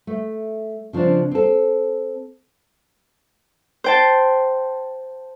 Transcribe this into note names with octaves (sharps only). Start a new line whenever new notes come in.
A3
C#3 F3 C4 D4
C4 A4
C5 G5 A5